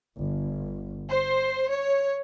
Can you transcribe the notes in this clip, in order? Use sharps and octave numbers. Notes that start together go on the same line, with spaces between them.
G1
C5
C#5